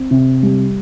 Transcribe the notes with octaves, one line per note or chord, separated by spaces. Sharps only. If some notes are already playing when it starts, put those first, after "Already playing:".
Already playing: C4
C3
G3